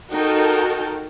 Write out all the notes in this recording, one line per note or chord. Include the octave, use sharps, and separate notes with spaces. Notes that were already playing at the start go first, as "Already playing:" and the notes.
D#4 F#4 A4 A#4 G5 A5